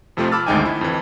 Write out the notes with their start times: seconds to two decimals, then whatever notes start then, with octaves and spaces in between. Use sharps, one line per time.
0.17 F2 C3 F3 A3 C4 F4
0.32 A5 B5 D6 E6 F6 A6
0.46 G#1 D2 G#3 D#4 G5 G#5
0.65 E4
0.81 F2 E3